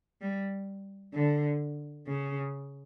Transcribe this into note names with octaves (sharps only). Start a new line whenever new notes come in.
G3
D3
C#3